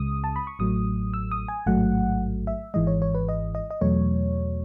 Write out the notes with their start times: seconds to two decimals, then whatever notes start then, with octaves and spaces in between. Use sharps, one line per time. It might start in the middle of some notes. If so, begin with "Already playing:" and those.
Already playing: C#2 C#3 G#3 D#6
0.24 A5
0.36 B5
0.47 C#6
0.59 A1 A2 F#3 A3 D#6
1.14 E6
1.31 D#6
1.48 G#5
1.66 A1 G#2 F#3 A3 F#5
2.47 E5
2.74 G#1 G#2 E3 G#3 D#5
2.87 C#5
3.02 C#5
3.14 B4
3.29 D#5
3.55 D#5
3.70 D#5
3.81 E2 B2 F#3 A3 C#5